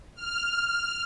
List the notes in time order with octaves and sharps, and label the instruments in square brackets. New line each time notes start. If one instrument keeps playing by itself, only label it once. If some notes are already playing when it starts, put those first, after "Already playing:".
[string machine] F6